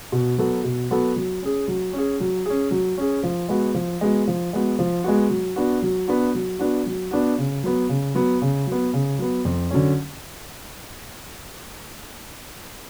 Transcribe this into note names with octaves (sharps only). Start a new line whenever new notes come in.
B2
F#3 B3 F#4 A4
B2
F#3 B3 F#4 A4
F#3
C#4 G#4
F#3
C#4
G#4
F#3
C#4 G#4
F#3
C#4 G#4
F3
G#3 B3 F#4
F3
G#3 B3 F#4
F3
G#3 B3 F#4
F3
G#3 B3 F#4
F#3
B3 D4 F#4
F#3
B3 D4 F#4
F#3
B3 D4 F#4
F#3
B3 D4 F#4
C#3
F#3 B3
C#3
F#3 B3
C#3
F#3 B3
C#3
F#3 B3
F2
D3 F#3 C#4